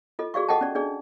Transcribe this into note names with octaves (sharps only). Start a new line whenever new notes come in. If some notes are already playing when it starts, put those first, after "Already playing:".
F4 A4 D#5
F#4 G#4 D5 F5 C#6
A4 D#5 F#5 G5 A5
C#4 D5
D4 G#4 D5